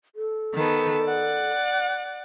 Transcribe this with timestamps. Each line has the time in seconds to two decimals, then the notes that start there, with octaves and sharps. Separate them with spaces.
0.15 A4
0.55 D#3 B3 A5
1.05 D5 F#5